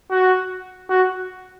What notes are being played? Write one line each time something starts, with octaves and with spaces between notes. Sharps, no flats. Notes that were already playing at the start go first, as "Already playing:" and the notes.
F#4
F#4